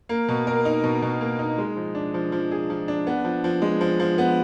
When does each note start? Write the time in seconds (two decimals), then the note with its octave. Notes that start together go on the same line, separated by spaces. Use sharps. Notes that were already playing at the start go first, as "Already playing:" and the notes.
0.09 A#3
0.28 B2
0.47 A#4
0.65 D#4
0.84 B2
1.02 B2
1.21 A#3
1.39 D#4
1.58 G#3
1.76 F3
1.95 D4
2.14 F3
2.32 F3
2.51 G#4
2.70 F3
2.88 D4
3.07 B3
3.25 F3
3.44 F3
3.62 G#3
3.81 F3
4.00 F3
4.18 B3